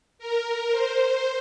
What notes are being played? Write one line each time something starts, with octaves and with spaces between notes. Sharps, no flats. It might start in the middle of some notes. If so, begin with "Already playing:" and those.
A#4
C5